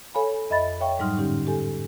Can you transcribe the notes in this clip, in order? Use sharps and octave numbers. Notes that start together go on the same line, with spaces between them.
A4 C#5 F5 G#5 B5
F2 D#5 E5 B5 A6
C#5 E5 F5 G5 C#6
G#2 F#3 G3 D#4 C6 F6
A2 D3 C#4 D#4 G4
G4 A4 G#5